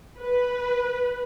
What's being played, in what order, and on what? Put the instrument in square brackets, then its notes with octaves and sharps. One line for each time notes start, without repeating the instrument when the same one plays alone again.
[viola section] B4